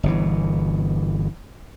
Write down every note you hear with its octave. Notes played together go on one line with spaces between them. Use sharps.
G1 B2 E3